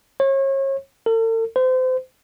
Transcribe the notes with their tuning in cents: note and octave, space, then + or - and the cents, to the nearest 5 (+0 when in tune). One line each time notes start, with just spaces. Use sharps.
C#5 -35
A4 +45
C5 -30